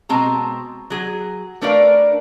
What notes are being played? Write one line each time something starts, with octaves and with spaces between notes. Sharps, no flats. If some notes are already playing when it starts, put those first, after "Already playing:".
B2 G#3 C4 A5 A#5
F#3 G#4
A3 D4 A#4 B4 D5 F5